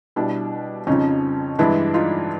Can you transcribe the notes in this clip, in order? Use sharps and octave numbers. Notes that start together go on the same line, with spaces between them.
B2 G3 D4 E4
F2 C#3 F3 C#4 D#4
G2 E3 G#3 D4 E4
D#4 F4